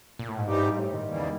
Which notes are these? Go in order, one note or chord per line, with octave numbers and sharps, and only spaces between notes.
A#2
A2
G#2
G2 E3 G3 C4 D#4 G4
G#2
A2
D#3
E2 C#3 E3 G3 A#3